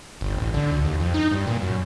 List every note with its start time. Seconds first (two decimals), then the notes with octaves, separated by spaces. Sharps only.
0.21 G1
0.37 A1
0.54 D3
0.71 D2
0.85 D#2
1.00 F2
1.14 D#4
1.32 G2
1.47 A#2
1.62 F#2